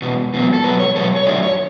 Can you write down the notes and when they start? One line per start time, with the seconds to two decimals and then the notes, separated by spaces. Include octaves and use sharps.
0.02 E2 B2
0.34 E2 B2 F#3
0.54 A4
0.64 E2 B2 F#3 B4
0.80 C#5
0.95 E2 B2 F#3 A4
1.16 C#5
1.27 F#2 D3 F#3 A3 D5
1.43 C#5